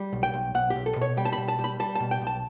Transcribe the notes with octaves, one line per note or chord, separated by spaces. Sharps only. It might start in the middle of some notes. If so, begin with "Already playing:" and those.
Already playing: G3
B1
G5
B1
B1 F#5
G4
B1
A4
B2
C#5
G3 G5
A5
B5
B2
A5
G3
B5
G3 A5
B2 A5
G5
B1
A5